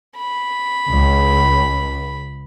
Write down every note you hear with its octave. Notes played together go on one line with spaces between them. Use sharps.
B5
C#2